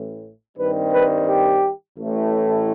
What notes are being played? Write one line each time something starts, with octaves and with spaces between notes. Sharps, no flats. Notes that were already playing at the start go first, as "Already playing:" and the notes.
Already playing: A1 A2 E3
G2 D#3 G3 C4 B4
B4
G4
A1 A2 E3 A3